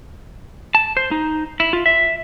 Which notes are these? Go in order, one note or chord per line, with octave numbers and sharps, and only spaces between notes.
A5
C5
D#4
E4
F4
E5